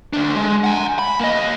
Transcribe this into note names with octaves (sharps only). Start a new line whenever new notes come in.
D2 D4
G#3
F#5 G#5
B5
A#3 D#5